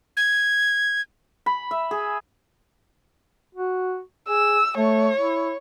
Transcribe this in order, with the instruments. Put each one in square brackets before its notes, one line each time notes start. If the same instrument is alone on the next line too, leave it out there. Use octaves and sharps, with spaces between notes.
[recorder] G#6
[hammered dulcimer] B5
E5
G#4
[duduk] F#4
[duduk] G#4 [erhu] E6
[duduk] A3 [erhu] C#5
[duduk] E4